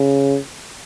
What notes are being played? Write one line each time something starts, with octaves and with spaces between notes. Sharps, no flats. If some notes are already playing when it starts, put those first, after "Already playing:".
Already playing: C#3